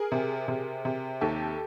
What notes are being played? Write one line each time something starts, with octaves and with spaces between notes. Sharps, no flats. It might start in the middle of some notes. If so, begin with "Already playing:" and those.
Already playing: G#4 A#4
C3
C3
C3
D#2 G4 A4